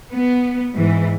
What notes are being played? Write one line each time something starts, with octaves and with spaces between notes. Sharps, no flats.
B3
G#2 E3